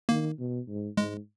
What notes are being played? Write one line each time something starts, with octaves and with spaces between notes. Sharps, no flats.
D#3 A#3
B2
G#2
G#2 G#3